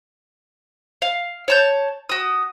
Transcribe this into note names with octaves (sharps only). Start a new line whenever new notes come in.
F5
C#5 A5 G6
F#4 D#6